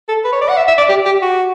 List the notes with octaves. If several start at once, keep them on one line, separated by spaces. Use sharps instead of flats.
A4
B4
C#5
D5
F#5
E5
E5
D5
G4
G4
F#4